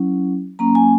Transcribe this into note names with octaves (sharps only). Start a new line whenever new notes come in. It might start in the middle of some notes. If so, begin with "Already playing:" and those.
Already playing: F#3 C#4 E4
F#3 A#3 C#4 A#5
G#5